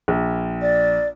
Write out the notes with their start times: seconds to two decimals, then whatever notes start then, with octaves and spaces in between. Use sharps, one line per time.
0.08 A#1
0.62 D5